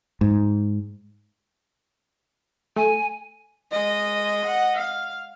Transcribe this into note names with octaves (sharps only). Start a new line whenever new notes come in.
G#2
A3 G#5
G#3 D#5
F#5
F5